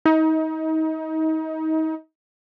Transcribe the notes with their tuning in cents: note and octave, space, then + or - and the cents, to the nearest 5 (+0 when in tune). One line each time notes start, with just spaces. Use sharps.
D#4 +30